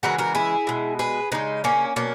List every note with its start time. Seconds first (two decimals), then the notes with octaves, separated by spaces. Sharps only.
0.03 C#3 E3 G#3 F#4 A#4
0.18 F#4 A#4
0.35 E4 G#4
0.67 B2 G#3
0.99 G#4 B4
1.32 C#3 G#3 B3 D#4
1.64 A#3 C#4
1.96 B2 F#3 A#3 C#4